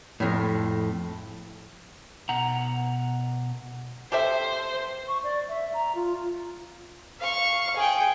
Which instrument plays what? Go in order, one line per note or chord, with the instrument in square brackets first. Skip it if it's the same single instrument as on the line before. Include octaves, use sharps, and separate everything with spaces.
[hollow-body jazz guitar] F2 A2
[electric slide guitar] B2 F#5 A#5
[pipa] G4 A4 E5 [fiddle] C5
[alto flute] C#6
D5
E5
A#5
F4
[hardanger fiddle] F5 C#6
G#4 G5